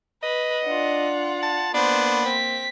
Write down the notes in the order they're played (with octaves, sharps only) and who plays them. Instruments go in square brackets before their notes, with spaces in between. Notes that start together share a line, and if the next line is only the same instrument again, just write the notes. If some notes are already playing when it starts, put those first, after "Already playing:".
[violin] B4 [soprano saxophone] D#5
[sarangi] D4 [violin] F4 F#5
[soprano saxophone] A5
[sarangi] A#3 [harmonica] B3 [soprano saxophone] D4 [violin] C5
[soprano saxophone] C4 [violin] B6